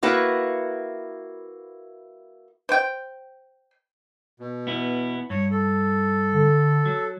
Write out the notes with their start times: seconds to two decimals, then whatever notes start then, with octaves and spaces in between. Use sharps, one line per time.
0.03 A#3 E4 F#4 B4
2.69 C5 G5
4.40 B2
4.67 B3 E4
5.30 G2 C#5
5.51 A4
6.34 D3
6.86 F#3